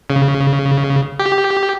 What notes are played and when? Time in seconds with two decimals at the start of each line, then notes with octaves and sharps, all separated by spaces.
0.10 C#3
1.20 G4